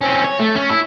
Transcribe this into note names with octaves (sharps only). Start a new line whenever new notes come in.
C4 C#4
C#5
A3
C#4
E4